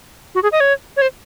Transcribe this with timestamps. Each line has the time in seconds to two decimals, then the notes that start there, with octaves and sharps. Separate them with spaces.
0.35 F#4
0.43 G#4
0.52 D#5
0.60 C#5
0.97 C#5
1.02 C5